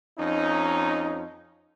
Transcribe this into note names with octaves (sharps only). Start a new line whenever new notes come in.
F2 C#4 D#4